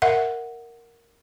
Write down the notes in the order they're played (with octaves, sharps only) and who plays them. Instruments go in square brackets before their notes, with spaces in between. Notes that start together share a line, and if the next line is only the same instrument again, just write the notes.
[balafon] A#4 E5 F#5